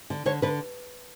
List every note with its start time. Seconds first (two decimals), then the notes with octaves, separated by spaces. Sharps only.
0.10 D3
0.26 D3 C#5
0.42 D3 B4